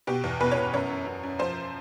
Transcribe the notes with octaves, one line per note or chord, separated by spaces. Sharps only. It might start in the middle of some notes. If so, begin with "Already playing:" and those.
B2 G4
E2
B2 B4
C#5
B2
F#2 C#5
F#2
F#2
F#2
F3 C5